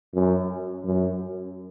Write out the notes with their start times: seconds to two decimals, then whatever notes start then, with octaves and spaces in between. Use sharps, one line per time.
0.14 F#2
0.85 F#2